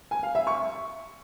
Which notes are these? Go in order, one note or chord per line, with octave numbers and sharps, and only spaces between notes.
G#5
F5
E5
C#6